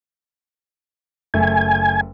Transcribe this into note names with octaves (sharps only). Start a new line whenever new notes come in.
F#1 A3 G#5